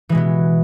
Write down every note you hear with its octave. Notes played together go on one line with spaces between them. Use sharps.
B2 E3 G#3 B3